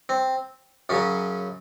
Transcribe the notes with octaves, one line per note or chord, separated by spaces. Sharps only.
C4
F#2 C#3 F#3 C#4